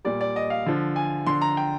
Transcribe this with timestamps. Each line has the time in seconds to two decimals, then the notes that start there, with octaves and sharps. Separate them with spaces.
0.05 A#2 G3 D5
0.21 D5
0.36 D#5
0.50 F5
0.66 D3 F3
0.96 G#5
1.26 D3 F3 C6
1.41 A#5
1.57 G5